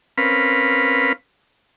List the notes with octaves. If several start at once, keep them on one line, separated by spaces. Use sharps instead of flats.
C4 C#4 A#4 B4 F5 B5